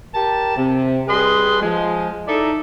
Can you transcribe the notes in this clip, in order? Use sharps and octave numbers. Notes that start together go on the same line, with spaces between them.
G4 A#4 A5
C3
G3 G#4 B4 D#5 C6
F3 G#3
D#4 E4 A4 D5 E5